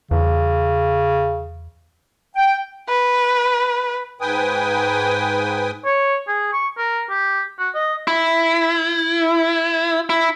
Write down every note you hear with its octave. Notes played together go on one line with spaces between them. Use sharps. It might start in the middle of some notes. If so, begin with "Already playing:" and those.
E2 C#3
G5
B4
G#2 B4 G5 G#5 D#6
C#5
G#4
C#6
A#4
G4
F#4
D#5
E4
E4